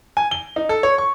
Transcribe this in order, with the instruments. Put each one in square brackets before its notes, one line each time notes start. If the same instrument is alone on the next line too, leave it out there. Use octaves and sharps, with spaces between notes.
[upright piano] G#5
G7
D#4
A4
C#5
C#6